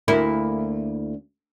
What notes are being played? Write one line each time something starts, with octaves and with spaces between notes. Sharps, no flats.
D2 A#3 E4